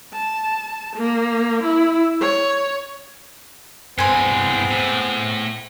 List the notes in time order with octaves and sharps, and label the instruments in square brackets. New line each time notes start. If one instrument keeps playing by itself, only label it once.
[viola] A5
A#3
E4
C#5
[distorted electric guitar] G2 E3 [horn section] G#3 B3 C4 [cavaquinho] C5 G#5
[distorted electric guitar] A2